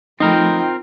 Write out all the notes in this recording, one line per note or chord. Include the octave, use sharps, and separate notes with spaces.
F3 A3 C4 D#4 F4 A#4 G5 B5